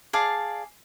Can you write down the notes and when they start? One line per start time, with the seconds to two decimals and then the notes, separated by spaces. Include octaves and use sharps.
0.13 G#4 D5 F5 A5